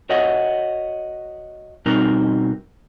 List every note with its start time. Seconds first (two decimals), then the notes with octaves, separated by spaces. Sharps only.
0.09 F#4 A#4 C#5 D#5 E5 F#5
1.86 B2 G3 C4 D#4 F#4 A#4